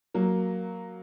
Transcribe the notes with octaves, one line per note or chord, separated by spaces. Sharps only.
F#3 A#3